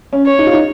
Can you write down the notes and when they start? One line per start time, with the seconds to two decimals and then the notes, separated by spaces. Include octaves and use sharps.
0.13 C#4
0.26 C#5
0.39 D#4
0.47 F4
0.53 D#4